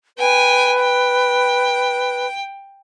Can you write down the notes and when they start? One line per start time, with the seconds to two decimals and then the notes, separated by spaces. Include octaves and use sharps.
0.18 B4 G5 G#5
0.80 G5